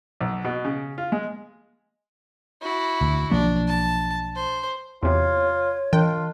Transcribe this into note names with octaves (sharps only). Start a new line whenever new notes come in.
B1
B2
C#3
F4
G#3
E4 F#4
D2
B1 F3 A#3 D4
A5
C5
E2 C3 F4 C#5
E3 F4 G5